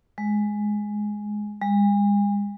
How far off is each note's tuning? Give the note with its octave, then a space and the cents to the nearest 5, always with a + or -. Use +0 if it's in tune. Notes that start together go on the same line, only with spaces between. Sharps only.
G#3 +5
G#3 -40